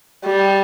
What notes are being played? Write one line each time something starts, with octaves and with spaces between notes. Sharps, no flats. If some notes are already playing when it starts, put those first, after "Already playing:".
G3